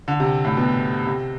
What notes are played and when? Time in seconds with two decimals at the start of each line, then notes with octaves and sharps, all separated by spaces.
0.08 D3
0.20 C3
0.45 A2
0.57 B2
1.07 C3